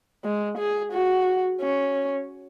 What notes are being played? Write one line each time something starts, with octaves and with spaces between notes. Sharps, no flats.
G#3
G#4
F#4
C#4